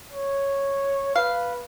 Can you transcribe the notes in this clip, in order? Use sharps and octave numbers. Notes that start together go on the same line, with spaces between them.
C#5
B4 F5